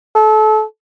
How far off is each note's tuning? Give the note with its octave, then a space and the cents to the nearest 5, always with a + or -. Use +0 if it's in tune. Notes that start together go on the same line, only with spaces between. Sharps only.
A4 -30